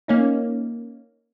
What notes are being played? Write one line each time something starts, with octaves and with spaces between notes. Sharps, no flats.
A#3 C#4 D#4